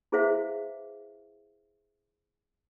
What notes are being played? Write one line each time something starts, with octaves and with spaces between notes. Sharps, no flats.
E4 G#4 B4 C5 E5 F5